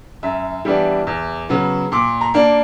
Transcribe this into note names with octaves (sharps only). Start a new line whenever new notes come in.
F#2 E5
E3 G3 B3 D4
E2
C#3 F#3 B3
A#2 D6
A#5
A#3 D4